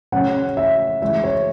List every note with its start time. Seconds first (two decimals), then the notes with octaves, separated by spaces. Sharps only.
0.12 C#3 F#3 C#4 F#5
0.57 E5
1.02 C#3 E3 G#3 E5
1.24 C#5